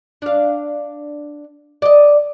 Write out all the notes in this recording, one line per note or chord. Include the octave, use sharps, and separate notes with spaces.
D4 F5
D5 D#5